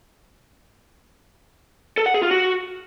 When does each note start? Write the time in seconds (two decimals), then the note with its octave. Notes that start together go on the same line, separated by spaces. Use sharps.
1.98 A4
2.06 F#5
2.14 G#4
2.23 F4
2.31 F#4